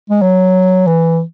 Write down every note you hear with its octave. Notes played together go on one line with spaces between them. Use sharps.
G#3
F#3
E3